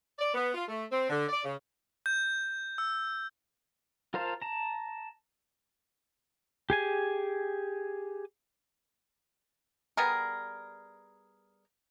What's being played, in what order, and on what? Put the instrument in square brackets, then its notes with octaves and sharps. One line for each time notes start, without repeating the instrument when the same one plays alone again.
[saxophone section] D5
B3
F4
A3
C4
D3
D5
C#3
[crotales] G6
E6
[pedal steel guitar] F4 A#4 C5 F5 A5
A5 A#5
G4 G#4 G#5
[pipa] G3 B3 G#4 A#4